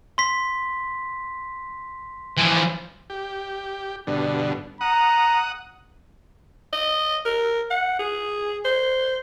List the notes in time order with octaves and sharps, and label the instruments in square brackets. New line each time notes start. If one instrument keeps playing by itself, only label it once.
[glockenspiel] C6 B6
[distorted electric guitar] E3 F3
[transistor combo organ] G4
G2 B2 D3
[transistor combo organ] F#5 D#6 [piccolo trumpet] A#5
[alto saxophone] D#5
A#4
F#5
G#4
C5